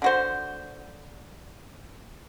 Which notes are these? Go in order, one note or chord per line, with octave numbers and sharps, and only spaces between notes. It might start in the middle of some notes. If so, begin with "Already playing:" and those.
D3 F#4 C5